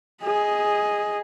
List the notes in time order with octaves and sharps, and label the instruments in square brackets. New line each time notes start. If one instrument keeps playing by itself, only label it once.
[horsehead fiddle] G#4 D#5